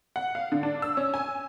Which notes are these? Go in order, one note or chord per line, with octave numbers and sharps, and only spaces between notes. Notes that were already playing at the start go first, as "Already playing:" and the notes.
F#5
F5
D3
D4
E6
C#4
G#5